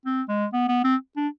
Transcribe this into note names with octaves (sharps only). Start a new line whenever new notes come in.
C4
G#3
B3
B3
C4
D4